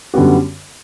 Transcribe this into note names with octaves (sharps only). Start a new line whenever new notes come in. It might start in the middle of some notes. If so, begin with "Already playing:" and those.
F#2 D3 G3 B3 F#4